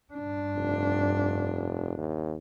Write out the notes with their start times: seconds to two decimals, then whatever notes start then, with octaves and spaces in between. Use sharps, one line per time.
0.14 G2 D4
0.55 F1
1.97 D#2